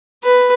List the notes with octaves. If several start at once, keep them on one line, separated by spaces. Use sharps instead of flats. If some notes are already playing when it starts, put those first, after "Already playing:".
B4